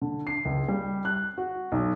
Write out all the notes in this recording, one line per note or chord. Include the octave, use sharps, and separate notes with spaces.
D3
C7
C#2
G3
F#6
F#4
B1